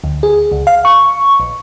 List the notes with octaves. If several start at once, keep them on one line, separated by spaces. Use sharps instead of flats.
D2
G#4
C#2
F5
C#6
A#1